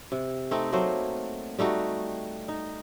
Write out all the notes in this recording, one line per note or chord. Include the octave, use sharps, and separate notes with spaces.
C3
A3 C4 D#4
F#3 A3 A#3 C5
G3 A3 D#4 F#4
D#4